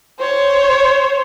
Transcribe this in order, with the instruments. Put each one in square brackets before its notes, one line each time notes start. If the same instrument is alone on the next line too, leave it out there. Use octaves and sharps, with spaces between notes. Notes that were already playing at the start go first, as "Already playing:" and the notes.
[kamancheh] C5 C#5